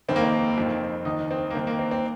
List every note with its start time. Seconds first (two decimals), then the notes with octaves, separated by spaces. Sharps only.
0.08 F1 D#2 D#3 C4
0.16 A#3
0.23 C4
0.57 F1 F2 D#3
1.05 D#2 D#3 D#4
1.31 C4
1.50 A#3
1.55 D#2 D#3 C4
1.67 A#3
1.79 C4
1.91 C4